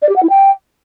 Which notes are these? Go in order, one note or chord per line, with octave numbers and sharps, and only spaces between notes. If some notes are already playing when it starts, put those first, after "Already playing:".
D5
G4
F#5
E4
G5